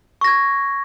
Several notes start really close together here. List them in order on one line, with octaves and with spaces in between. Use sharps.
C#6 A#6 G#6